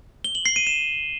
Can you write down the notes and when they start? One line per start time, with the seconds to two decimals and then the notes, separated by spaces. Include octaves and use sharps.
0.24 G7
0.35 F#7
0.46 C7
0.56 D#7
0.67 E7